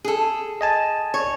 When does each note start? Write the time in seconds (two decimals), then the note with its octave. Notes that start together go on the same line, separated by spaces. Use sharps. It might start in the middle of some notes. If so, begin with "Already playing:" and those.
0.04 G#4 A4
0.61 D#5 G#5 A5
1.14 C#5